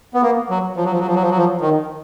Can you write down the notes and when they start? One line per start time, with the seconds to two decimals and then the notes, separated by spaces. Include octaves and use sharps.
0.14 B3
0.22 A#3
0.50 F#3
0.77 F3
0.85 F#3
0.92 F3
0.99 F#3
1.07 F3
1.15 F#3
1.22 F3
1.30 F#3
1.38 F3
1.61 D#3